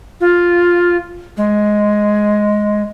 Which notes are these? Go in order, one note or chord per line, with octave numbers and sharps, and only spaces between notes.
F4
G#3